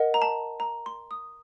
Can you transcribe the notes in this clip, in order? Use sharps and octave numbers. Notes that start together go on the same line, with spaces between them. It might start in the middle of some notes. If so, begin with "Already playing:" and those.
Already playing: A#4 D#5 F#5
A#5
A5
A#5
C6
D#6